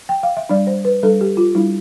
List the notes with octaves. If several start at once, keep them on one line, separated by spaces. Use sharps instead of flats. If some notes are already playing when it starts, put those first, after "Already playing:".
G5
F5
E5
G3 D4 D5
C5
B4
G3 D4 A4
G4
F4
G3 D4 E4